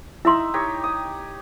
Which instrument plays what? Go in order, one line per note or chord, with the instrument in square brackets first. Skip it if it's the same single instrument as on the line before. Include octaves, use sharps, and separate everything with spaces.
[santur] D#4 E5 [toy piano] E4 C6
[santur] D#4 G4 C#5
D#6